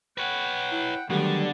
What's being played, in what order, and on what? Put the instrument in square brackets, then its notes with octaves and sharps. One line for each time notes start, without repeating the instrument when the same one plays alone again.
[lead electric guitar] B4 C#5 [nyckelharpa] F#5 G5
[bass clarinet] E4
[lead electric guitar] D3 [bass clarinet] D#3 [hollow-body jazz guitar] F#3 G3 A3 [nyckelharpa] B3 D5